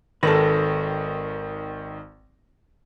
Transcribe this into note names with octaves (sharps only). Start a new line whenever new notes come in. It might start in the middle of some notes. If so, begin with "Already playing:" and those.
G#1 D#3 A4 B4 A#6